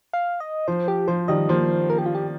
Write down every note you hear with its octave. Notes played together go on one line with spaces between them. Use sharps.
F5
D#5
F3 C5
G4
F3 C5
D#3 G3 D#5
F3 A#3 C5
A#4
G4
F4
G4